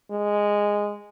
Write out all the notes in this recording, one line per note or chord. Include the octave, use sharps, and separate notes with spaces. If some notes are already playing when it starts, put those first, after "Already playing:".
G#3